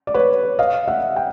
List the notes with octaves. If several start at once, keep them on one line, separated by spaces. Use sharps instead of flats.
D5
B4 C#5
D#5 F5
E5 F#5
G5